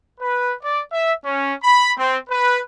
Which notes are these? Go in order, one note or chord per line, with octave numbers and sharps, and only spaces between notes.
B4
D5
E5
C#4
B5
C4
B4